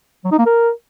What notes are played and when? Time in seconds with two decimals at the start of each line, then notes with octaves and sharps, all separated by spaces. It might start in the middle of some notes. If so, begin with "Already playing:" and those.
0.25 F#3
0.32 D#4
0.39 A#3
0.46 A#4